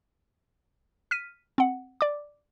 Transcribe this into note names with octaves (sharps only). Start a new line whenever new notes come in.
F6 B6 D#7
C4 F#5
D5 D6